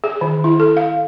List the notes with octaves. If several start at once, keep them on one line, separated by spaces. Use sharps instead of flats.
G#4
D#3
E4
A4
F5